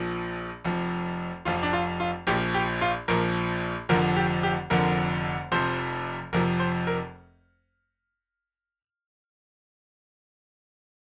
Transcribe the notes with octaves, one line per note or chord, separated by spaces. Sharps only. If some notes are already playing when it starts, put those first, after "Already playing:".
Already playing: A#1 A#2 F3
F1 F2 F3
F1 F2 F3 F4
D4
F4
F4
A#1 A#2 F3 G4
G4
F4
A#1 A#2 F3 A#4
F1 F2 D3 F3 A#4
G4
G4
F1 F2 D3 F3 A#4
F1 F2 C3 F3 C5
F1 F2 C3 F3 A#4
C5
A#4